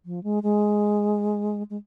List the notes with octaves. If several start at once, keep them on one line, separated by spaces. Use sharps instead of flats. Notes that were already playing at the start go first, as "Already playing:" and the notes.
F3
G#3
G#3
G#3